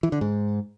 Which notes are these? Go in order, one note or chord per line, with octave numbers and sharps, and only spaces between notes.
E3
D3
G#2